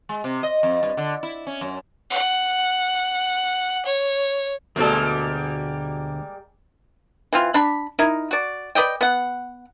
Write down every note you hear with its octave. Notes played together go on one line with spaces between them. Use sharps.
G#3
C3
D#5
F2
G2
D3
E4
C#4
F#2
F#5
C#5
D2 B2 G3 G#3 A#3 A4
E3 C4 F4
D4 B5
D#4 E4 A#4
F#4 D5
B4 D5 D#5 G5
B3 F#5